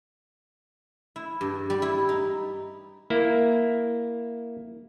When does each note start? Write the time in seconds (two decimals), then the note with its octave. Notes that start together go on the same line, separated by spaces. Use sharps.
1.16 E4
1.41 G2
1.70 G3
1.82 E4
2.09 D#4
3.10 A#3 E4